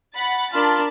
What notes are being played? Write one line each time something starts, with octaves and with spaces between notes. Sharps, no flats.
F#5 B5 A6
D4 F4 A#4 A5 B5